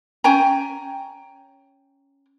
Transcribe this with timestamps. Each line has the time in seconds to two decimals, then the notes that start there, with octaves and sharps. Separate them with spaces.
0.24 C#4 G5 G#5 A#5